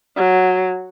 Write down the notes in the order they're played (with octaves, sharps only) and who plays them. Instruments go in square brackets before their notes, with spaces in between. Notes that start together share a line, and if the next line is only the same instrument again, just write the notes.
[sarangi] F#3